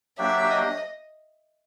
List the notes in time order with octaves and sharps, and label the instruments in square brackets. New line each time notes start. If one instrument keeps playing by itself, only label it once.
[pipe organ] F#3 A#3 D4 G4 [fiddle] E5
[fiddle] D#5